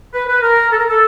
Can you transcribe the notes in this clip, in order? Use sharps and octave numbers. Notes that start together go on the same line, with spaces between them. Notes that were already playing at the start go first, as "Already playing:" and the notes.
B4
B4
A#4
A4
A#4
A4